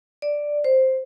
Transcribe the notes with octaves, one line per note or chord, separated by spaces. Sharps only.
D5
C5